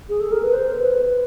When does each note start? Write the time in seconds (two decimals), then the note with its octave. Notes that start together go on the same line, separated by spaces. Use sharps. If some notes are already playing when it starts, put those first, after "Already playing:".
0.09 G#4
0.20 A4
0.32 A#4
0.43 B4
0.53 C5
0.76 B4